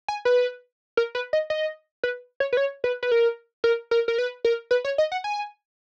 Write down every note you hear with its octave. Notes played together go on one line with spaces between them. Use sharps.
G#5
B4
A#4
B4
D#5
D#5
B4
C#5
B4
C#5
B4
B4
A#4
A#4
A#4
A#4
B4
A#4
B4
C#5
D#5
F#5
G#5